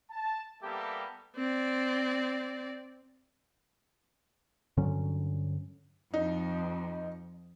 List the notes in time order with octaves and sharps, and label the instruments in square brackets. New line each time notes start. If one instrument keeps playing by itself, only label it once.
[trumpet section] A5
G3 A#3 B3 G4 A4 E5
[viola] C4 D5
[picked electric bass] G2 D3 F#3 C#4
[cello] F2 [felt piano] D#4